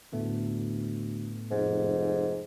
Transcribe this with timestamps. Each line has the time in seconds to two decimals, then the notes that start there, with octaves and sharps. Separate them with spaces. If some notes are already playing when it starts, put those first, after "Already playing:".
0.13 D2 A2 A3 B3
1.51 F1 G#2